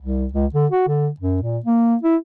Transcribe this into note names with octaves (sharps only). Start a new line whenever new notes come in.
C2
C#2
D3
F#4
D3
F#2
A#2
A#3
E4